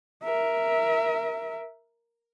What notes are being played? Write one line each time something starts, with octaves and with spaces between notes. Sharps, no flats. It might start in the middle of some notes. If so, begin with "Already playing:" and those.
A#4 E5